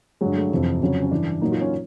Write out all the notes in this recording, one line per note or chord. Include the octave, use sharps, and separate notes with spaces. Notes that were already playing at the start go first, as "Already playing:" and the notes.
G2 D3 F#3 G#3
A3
F2 C3 E3
F2 C#3 F#3
C#4
G2 E3 D4
A#2 F#3 D#4
F4
C#4